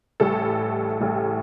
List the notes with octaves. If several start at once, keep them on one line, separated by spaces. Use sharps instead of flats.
A1 A2 G3 A4
A1 A2 G3